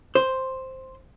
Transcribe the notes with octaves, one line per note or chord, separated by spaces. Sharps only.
C5